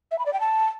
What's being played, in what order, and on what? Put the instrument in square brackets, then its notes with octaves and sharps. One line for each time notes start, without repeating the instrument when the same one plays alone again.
[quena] E5
B5
D5
G5
A5